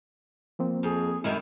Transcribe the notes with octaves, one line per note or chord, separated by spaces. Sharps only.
F3 A#3 C4
F2 G#4
F#2 D#3 G#3 E4